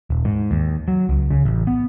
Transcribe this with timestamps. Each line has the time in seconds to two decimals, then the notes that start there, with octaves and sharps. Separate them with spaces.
0.10 D#1
0.25 G#2
0.51 D#2
0.88 F#3
1.09 C#2
1.30 C#3
1.45 A1
1.67 B3